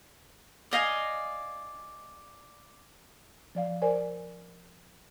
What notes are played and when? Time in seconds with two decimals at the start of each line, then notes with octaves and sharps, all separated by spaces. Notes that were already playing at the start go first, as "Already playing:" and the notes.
0.71 D5 D#5 F5 G#5
3.55 F3 D5 F5
3.82 A#4 C5 D5 G#5